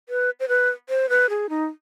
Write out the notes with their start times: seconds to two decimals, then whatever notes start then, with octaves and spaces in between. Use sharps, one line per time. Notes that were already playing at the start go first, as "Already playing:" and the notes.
0.09 B4
0.40 C5
0.48 B4
0.89 C5
1.09 B4
1.30 G#4
1.49 D#4